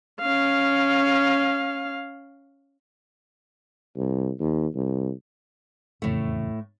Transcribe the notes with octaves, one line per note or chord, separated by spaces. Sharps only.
C#4 F5
C2
D#2
C2
F1 E2 A2 C#3 A3